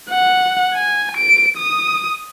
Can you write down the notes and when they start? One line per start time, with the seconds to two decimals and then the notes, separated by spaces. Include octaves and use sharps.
0.11 F#5
0.73 G#5
1.17 D7
1.57 D#6